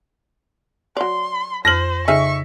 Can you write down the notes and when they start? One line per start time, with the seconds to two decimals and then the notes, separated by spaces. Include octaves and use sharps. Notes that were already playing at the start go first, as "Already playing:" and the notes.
0.97 F#3 D5 C6
1.65 F2 C5 F6 A#6 F#7
2.08 C#3 D#4 G#4 A4 E5 C#6